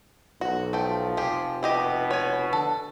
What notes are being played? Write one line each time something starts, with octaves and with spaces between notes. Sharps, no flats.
B1 F#4
F3 A3 G5
F1 G4 G#4
B2 E4 G4 D#5
C#5 G#5
D3 A4